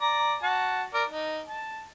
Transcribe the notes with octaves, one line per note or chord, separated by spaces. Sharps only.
D5 A#5
F#4 A5
A#4 D5
D#4
A5